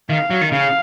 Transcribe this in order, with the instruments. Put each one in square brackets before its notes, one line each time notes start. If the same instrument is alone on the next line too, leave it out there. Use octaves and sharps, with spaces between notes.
[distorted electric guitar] D#3 [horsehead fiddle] F5
[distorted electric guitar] F#3
D#3
[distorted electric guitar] C#3 [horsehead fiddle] F5